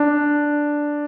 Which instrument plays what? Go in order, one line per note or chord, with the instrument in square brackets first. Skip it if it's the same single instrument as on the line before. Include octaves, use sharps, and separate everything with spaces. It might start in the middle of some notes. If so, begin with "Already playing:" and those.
Already playing: [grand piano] D4